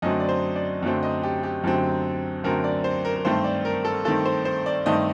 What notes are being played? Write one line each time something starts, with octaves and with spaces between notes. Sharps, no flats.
F#2 D3 F#3 A3 C4 D#5
D5
C5
D5
F#2 D3 F#3 A3 C4
D#5
G4
G4
F#2 D3 F#3 A3 C4
F#2 D3 F#3 A3 C4 A#4
D5
C5
A#4
A#4
G2 D#3 A3 C4 C5
D5
A#4
A4
G2 D#3 A3 C4 A4
C5
C5
D5
G2 D#3 A3 C4 D#5